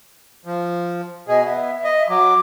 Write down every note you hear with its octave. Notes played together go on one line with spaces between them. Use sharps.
F3
B2 G#4 D#5
B3 E5
D#5
F#3 D6